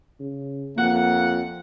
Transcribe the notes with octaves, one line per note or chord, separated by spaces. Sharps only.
C#3
F2 A#3 F#5